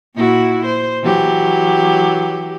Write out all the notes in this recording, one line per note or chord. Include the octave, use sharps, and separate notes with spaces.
A#2 E4 F#4
C5
E3 F#3 G4